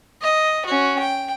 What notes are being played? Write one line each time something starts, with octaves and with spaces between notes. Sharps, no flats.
D#5
C#4 F#4
G5